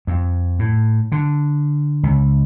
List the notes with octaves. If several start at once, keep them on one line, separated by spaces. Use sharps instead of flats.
F2
A2
D3
C#2